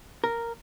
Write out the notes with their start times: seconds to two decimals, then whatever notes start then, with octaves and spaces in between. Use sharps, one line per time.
0.24 A#4